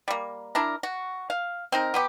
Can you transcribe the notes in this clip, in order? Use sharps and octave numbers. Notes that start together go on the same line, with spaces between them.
G3 A#3
D4 E4 A#4
F#4
F5
C4 D#4 A#4
F#3 B3 G4